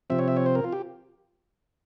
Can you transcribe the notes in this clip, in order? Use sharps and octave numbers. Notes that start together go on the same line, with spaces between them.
C3 F3 C4 E5
C#5
E5
C#5
C5
A#4
F4
G4